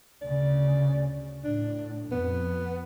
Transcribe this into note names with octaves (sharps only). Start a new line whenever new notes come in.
D2 C#3 D5
A2 D4
F2 B3